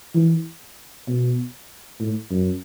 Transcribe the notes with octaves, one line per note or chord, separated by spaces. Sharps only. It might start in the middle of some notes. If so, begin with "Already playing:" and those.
E3
B2
A2
F#2